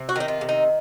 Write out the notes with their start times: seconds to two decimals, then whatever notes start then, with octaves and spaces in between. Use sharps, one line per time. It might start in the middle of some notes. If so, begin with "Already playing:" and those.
Already playing: C3
0.09 F#4
0.16 D#3 D#4
0.28 F4
0.41 C3
0.49 D#4